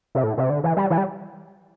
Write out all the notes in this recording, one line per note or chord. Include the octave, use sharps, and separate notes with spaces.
C3
A2
C3
D3
E3
G3
E3
G3